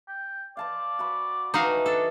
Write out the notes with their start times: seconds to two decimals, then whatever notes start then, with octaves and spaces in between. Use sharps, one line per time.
0.08 G5
0.57 D5 F5 A5 C6
0.99 F#4 B5
1.54 E3 D#4 F#4 D#5 F5 A5
1.86 D4 A4